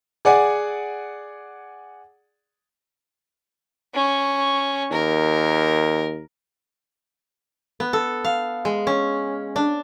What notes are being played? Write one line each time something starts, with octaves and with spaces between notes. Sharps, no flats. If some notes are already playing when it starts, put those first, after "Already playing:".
G#4 D5 F#5 G#5
C#4 C#6
D#2 A#4
B3
A4
F5
G#3
C#4
D4